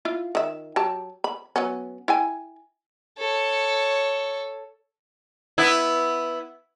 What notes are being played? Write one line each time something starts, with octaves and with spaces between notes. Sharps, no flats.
E4 F4 F5
D#3 E5
F#3 G4 A5
B5
F#3 B3 C#4
E4 G5 G#5
A4 C#5
B3 E4